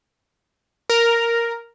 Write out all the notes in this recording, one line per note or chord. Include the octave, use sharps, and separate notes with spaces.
A#4